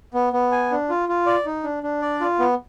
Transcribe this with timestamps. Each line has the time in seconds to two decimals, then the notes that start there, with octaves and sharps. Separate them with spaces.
0.14 B3
0.33 B3
0.52 G#5
0.71 D4
0.90 F4
1.09 F4
1.26 D5
1.46 D#4
1.64 D4
1.83 D4
2.02 D5
2.21 F4
2.39 B3